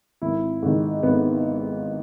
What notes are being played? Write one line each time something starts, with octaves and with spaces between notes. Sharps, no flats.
G#1 E4
G#2 D#3
G#1 B3